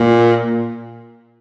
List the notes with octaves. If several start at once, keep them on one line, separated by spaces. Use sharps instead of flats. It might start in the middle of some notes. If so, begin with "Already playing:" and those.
Already playing: A#2